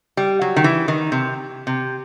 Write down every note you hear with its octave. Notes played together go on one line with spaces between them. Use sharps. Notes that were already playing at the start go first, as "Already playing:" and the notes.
G3
F#3
D#3
E3
D#3
C3
C3